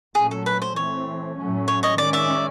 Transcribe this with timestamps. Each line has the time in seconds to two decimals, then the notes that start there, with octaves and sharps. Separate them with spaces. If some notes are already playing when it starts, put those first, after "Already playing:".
0.15 A#2 F#3 A3 C#4 G#4
0.31 A4
0.46 B4
0.62 C5
0.76 E3 A3 C4 C#5
1.37 A2 F#3 A3 C#4
1.68 C#5
1.83 C#5 D#5
1.98 D#3 G#3 C#4 D5
2.13 D5 E5